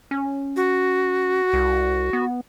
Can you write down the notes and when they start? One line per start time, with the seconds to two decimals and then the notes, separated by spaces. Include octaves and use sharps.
0.11 C#4
0.56 F#4
1.53 C2
2.13 B3